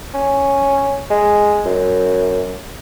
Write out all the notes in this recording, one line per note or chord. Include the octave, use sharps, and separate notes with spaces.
C#4
G#3
F#2